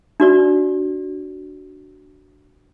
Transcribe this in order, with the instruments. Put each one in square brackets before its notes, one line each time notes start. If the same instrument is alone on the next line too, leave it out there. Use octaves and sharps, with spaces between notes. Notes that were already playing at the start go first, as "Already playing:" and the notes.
[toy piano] D4 F#4 D5